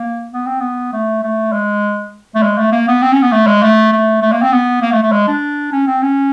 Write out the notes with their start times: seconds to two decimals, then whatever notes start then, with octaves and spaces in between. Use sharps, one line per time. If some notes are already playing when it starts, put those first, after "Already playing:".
Already playing: A#3
0.33 B3
0.47 C4
0.60 B3
0.93 A3
1.23 A3
1.53 G#3
2.35 A3
2.43 G#3
2.58 A3
2.72 A#3
2.88 B3
3.02 C4
3.13 C#4
3.22 B3
3.32 A3
3.47 G#3
3.63 A3
3.92 A3
4.23 A3
4.32 A#3
4.42 C4
4.53 B3
4.82 A#3
4.92 A3
5.03 A3
5.12 G#3
5.28 D4
5.72 C#4
5.87 C4
6.02 C#4